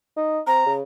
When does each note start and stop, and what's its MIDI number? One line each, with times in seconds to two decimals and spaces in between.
0.16 0.40 63
0.47 0.65 60
0.47 0.72 82
0.66 0.82 49